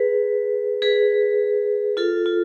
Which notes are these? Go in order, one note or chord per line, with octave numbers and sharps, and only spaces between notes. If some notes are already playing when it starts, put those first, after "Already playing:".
Already playing: G#4 B4
G#4 B4
F4 A4
F4